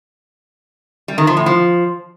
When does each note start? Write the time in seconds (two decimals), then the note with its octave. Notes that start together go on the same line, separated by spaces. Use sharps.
1.08 G3
1.18 D#3
1.27 F3
1.37 A2
1.46 F3